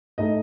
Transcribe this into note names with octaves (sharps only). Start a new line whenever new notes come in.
A2 A3 D#4 D#5